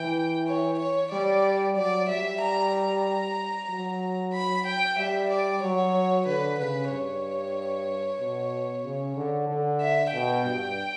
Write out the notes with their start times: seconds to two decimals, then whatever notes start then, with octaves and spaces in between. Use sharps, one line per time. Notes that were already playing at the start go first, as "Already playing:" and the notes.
Already playing: E3 G5
0.47 C#5
0.79 C#5
1.12 G3 D5
1.76 F#3 D5
2.08 G3 E5
2.41 A#5
2.73 A#5
3.69 F#3
4.33 B5
4.66 G5
4.98 G3 E5
5.30 D5
5.62 F#3 C#5
6.26 D3 B4
6.59 C#3 B4
6.91 G2 C#5
8.20 B2
8.84 C#3
9.16 D3
9.48 D3
9.81 E5
10.13 B2 G5
10.45 G2